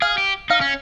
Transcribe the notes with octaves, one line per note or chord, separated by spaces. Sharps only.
G#4 F5
G4
D#4 F5
C#4